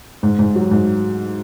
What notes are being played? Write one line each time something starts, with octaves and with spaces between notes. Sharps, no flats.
G#2
G#2
F#3
G#2